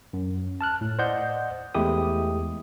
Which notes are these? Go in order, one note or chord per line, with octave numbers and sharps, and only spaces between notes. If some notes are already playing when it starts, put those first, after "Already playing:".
F#2
A5 F6 F#6
A2
C5 D5 D#5 F#5 G6
E2 G#3 A3 E4 G4 D#6